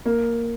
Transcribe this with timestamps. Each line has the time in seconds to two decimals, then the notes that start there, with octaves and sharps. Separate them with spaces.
0.05 A#3